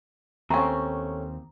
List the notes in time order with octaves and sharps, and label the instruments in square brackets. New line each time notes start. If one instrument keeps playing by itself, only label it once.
[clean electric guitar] D#2 [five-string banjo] A3 C#4 [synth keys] C4 [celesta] A#5